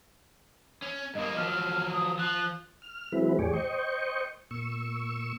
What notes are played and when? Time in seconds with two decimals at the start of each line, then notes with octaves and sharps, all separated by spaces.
0.82 C#4
1.15 G2 A#3 D#5
1.36 F3 F#3 F6
1.93 D#6
2.19 F3 F#6
2.82 F6
3.12 E3 F#3 G#3 C4 E4 B4
3.39 E2 A2 G4 G#4 C#5 D5
3.53 C5 D#5 G5 C#6
4.51 A#2 C#6 E6